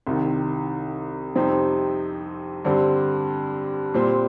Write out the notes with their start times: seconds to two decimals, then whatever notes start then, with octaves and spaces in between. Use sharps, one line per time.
0.07 C2 C3 D#3
1.35 F2 C3 G3 C4 D#4
2.65 G2 D3 G3 C4
3.94 A#2 G3 C4